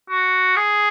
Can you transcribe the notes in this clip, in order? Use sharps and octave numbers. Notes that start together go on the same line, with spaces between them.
F#4
G#4